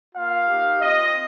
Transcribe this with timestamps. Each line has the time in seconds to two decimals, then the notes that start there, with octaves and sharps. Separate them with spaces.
0.14 A#3 F4 F5
0.48 A#3 D#4 G4
0.81 C4 F4 D#5